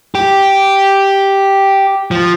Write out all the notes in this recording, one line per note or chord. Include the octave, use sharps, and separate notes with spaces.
G4
F3